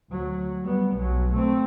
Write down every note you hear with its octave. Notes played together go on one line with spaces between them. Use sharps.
D2 F#3
G3 B3
B1 F#3
A3 C4